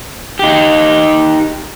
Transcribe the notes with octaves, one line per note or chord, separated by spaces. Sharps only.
D#4 G4